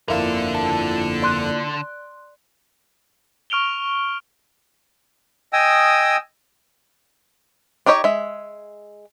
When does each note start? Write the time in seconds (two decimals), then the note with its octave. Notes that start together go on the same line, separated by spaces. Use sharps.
0.08 G1 F2 D3 A#3 D4 E4 F4 A4
0.55 A5
1.22 D5 C6 F#6
3.50 C#6 F6 D7 F7 G7
5.53 D#5 G5 G#5 D#6 E6
7.86 D4 D#4 G4 C#5 D#5
8.04 G#3 E5